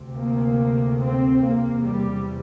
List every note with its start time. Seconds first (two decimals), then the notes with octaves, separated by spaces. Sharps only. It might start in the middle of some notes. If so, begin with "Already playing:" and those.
Already playing: D2 C3
0.16 A#3
1.01 C4
1.43 E2 C3 A#3
1.85 G3